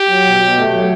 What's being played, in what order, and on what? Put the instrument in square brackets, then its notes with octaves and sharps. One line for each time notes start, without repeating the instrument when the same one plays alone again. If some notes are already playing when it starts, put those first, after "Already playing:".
Already playing: [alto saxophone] G4
[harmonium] F#3
B2
B2
A3
F#3